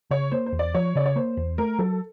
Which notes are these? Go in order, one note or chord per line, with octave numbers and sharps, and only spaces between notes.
C#3 C#5
A#3 C5
C5
E2
D5
F3 C#5
C#3 D5
C#5
A#3 C5
E2
A3 A#4
F#3 A4